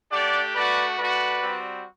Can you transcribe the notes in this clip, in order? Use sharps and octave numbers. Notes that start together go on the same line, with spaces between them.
A3 D4 G4 D5 F#5
A3 D4 F#4 B4 D5
A3 D4 F#4 B4 D5
G3 C4 F#4